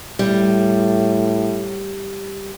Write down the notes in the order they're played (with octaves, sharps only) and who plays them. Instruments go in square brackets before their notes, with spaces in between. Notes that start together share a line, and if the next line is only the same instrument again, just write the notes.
[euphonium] A2 [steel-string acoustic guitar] G3